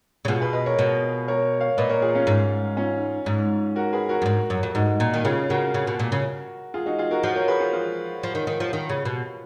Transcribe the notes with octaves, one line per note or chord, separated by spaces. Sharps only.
C#3
B2 F4 G#4
G#4 B4
B4 D#5
A#4 C#5
B2
A#4 C#5
C#5 F5
A#2 B4 D#5
A#4 C#5
F4 G#4
C#4 F4
G#2
C#4 F4
G#2
F#4 A#4
G#4 B4
F#4 A#4
F#2
G#2
F#2
F2
G#2 D#4 F#4
A#2
D#3
C#3 F4 G#4
C#3 F#4 A#4
C#3
B2
A#2
C#3
F4 G#4
D#4 F#4
F4 G#4
F#4 A#4
F3 F#4 A#4
A#4 C#5
G#4 B4
F4 G#4
F4 G#4
F3
D#3
D#3
F3
D#3
C#3
B2